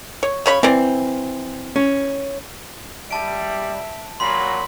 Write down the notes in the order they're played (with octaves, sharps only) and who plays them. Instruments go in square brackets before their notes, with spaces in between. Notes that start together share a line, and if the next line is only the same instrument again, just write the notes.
[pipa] C#5
C#3 C#5 B5
[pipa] E3 D5 [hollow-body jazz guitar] C4
[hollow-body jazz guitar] C#4
[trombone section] G3 [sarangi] E5 [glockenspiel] A5 D7
[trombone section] A#2 F#3 [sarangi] B5 [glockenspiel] C6